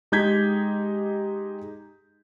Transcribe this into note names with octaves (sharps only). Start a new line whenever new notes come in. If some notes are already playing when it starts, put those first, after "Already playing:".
G#3 D#4 G4 G6 G#6 B6